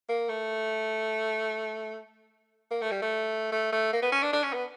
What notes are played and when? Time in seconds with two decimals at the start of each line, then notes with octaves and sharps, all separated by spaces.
0.09 A#3
0.29 A3
2.71 A#3
2.81 A3
2.91 G3
3.02 A3
3.52 A3
3.72 A3
3.93 A#3
4.02 B3
4.12 C#4
4.22 D4
4.33 D4
4.43 C#4
4.53 B3